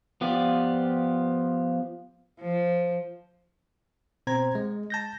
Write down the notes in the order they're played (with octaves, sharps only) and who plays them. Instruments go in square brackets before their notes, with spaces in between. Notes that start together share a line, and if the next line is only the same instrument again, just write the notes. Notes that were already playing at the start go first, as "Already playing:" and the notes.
[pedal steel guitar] F3 B3 F4 G4 D5
[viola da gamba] F3
[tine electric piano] B2 C4 C5 A#5 G#6
G#3
A5 G6 A#6